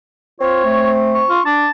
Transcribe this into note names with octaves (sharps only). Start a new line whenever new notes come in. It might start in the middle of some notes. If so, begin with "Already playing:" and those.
C4 F4 C#5
A3
C#6
F4
D4 A5